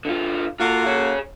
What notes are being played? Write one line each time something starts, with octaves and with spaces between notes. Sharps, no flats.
D3 F4
A#3 F4 F#4 A4
G#4 C#5